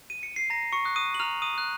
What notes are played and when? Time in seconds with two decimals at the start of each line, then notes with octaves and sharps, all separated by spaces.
0.10 D#7
0.23 C#7
0.36 C7
0.50 A#5 A#6
0.73 C#6 C#7
0.85 D#6 F#6
0.96 D#6 D#7
1.14 F#7
1.19 A#5 F6 F7
1.42 D#6 D#7
1.53 D#6
1.58 F#6